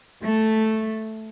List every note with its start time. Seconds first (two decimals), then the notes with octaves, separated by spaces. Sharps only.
0.24 A3